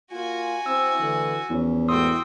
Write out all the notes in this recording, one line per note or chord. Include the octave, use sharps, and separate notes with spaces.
A#3 F4 F#4 G#5
C4 E4 E6
D3 E3 A3
E2 F3 C#4
G#2 C3 A3 F#4 G5 C6 D#6 E6